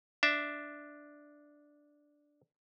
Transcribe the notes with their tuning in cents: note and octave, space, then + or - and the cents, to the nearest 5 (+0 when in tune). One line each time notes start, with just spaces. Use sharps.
D4 +0 E5 +0